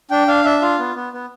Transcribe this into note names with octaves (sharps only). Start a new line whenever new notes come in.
D4 G5
D4 F5
D4 E5
F4 F5
B3
B3
B3